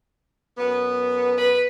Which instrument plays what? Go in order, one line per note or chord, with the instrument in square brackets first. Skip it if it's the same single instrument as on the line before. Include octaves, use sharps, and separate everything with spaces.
[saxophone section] F#2 B3
[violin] B4